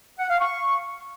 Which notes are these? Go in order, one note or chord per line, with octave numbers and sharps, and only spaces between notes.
F#5
F5
C#6